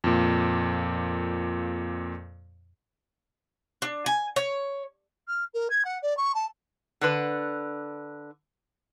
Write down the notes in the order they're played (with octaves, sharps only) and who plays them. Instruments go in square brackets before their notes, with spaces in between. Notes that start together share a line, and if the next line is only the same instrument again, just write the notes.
[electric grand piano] F2 A#2
[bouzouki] D4
G#5
C#5
[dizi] F6
A#4
G#6
F#5
D5
C#6
A5
[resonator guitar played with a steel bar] D3 D4 B4